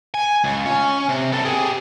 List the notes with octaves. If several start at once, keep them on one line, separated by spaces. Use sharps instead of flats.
G#5
C#2
C#4
C3
B3 A4
G4 G#4